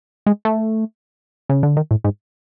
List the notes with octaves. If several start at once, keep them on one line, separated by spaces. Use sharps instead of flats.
G#3
A3
C#3
D3
D#3
A2
G#2